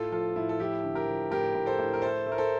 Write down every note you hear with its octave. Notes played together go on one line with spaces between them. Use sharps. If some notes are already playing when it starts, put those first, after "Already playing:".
Already playing: A2 F4 A4
F3 F4 A4
A2 E4
A4
F3 E4 G4
D3
G4 A#4
F3
A2 G4 A#4
A2
A4 C5
A2
A#4
A3 A4 C5
A3
A#4
A4 C5